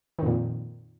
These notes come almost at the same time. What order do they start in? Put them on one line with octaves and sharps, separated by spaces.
D#3 F2 A#2